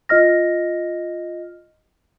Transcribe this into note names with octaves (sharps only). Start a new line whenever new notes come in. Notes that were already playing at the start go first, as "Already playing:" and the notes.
F4 D#5 F6 A#6